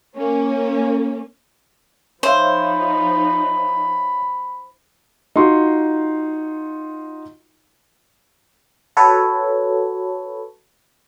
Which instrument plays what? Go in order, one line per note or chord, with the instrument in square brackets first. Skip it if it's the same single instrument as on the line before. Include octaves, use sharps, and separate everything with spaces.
[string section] A#3 C#4
[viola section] F3 D#4 [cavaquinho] C5 [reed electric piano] C#5 E5 F5 [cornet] B5
[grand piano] D#4 F4 F#4 C6 C#6
[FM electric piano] F#4 A4 B4 C#5